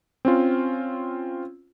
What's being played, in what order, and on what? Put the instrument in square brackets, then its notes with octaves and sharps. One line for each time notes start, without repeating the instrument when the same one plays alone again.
[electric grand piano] C4 C#4 F4